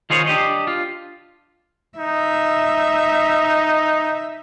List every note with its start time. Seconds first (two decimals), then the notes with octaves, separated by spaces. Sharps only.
0.10 D#3 F4 G#4 C5 C#5
0.27 D4 G4 D#5
0.67 F4
1.98 D#4 E5